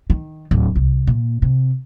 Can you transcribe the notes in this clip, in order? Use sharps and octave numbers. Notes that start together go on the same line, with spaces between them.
D#3
D1
C2
A#2
C3